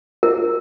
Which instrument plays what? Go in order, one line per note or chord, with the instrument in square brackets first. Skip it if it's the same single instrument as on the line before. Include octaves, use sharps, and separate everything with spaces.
[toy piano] A#4